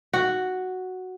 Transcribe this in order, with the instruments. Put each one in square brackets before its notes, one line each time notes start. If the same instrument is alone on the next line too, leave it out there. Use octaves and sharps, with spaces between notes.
[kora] F#4